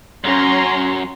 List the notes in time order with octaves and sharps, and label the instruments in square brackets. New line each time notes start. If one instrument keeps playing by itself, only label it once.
[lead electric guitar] F#2 [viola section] C#4 A#5 C6